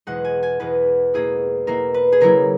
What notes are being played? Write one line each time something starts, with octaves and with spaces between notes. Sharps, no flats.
E2 B2 G#3 F#5
G#5
G#5
E2 B2 G#3 B4
B2 A#3 E4 G#4
B2 A#3 E4 A#4
B4
G#4
C#3 F#3 A#3 E4 A#4